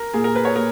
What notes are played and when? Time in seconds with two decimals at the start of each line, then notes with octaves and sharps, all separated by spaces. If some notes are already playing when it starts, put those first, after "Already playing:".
Already playing: A#4
0.13 A#2 G#4
0.24 A#4
0.36 B4
0.45 C#5
0.56 A#2 A#4